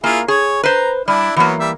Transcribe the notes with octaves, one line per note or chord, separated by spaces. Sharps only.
A#3 E4 F4 G#4
G#4 C#5
B4 C5 A#5
G3 D4 E4
E3 F#3 A#3 B3
G3 E5